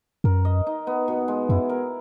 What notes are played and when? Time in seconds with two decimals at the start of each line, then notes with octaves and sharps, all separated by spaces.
0.24 F#2 A#4
0.45 D#5
0.67 D#4
0.87 B3
1.08 B2
1.28 G#3
1.49 F#2 E4
1.69 A#4